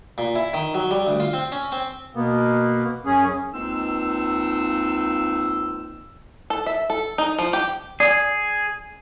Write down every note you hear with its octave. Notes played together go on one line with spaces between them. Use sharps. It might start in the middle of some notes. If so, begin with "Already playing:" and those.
A#2
E4
D#3
F#3
G3
D2
F4
C4
C#4
C4
B2 A#3 B3
F#2 C#4 G#4
C#2 A#3 C4 D#4 E6
A4
E5
A4
D#4
F3
G4
G#4 D5